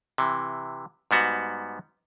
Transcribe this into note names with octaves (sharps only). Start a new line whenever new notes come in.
C3 E3
G#2 G3 B3 F#4